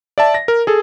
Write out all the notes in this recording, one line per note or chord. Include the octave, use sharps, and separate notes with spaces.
D5 E5 A5
A#6
A#4
G#4 A4